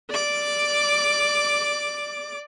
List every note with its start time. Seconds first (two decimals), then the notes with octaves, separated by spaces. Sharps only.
0.10 D5 D6